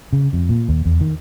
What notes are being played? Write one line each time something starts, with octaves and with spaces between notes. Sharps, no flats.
C#3
F2
A#2
D#2
E2
D#3